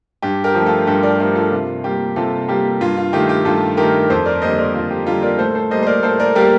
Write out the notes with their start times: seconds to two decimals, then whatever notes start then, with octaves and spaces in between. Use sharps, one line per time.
0.22 G2 G4
0.44 G4 A#4
0.55 F3
0.60 A3
0.66 F4 A4
0.87 G2 G4 A#4
1.03 A#4 D5
1.19 F3 A3 G4 A#4
1.35 F4 A4
1.52 C3 F4
1.84 G3 A#3 G4
2.16 C3 F4 A4
2.48 G3 A#3 G4
2.81 G2 F4
2.97 F4
3.13 D#3 A3 G4
3.29 G4
3.45 G2 F4 A4
3.77 D#3 A3 G4 A#4
4.10 F2 A4 C5
4.25 A#4 D5
4.42 D3 G3 A#3 C5 D#5
4.58 A#4 D5
4.74 F2 F4
4.91 G4
5.06 D3 G3 A#3 F4 A4
5.23 A#4 D5
5.38 A2 A4 C5
5.55 A4 C5
5.71 G3 A#3 C5 D#5
5.83 C5
5.87 A#4 D5
6.03 A2 A4 C5
6.20 A#4 D5
6.35 G3 A#3 G4 A#4